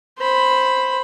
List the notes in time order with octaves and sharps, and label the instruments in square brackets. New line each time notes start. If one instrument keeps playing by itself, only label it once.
[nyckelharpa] C5 B5